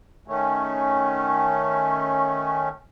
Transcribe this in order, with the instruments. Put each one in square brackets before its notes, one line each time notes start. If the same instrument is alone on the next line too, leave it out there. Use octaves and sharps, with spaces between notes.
[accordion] D#3 A3 C#4